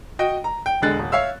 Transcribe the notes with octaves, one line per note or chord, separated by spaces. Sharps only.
F#4 D#5 G5
A#5
G5
E1 D3 G#3 F#6 A6
D#1
C#5 E5 F5 E6